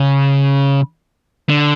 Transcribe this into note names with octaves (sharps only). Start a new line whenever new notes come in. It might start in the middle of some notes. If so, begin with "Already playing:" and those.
Already playing: C#3
D3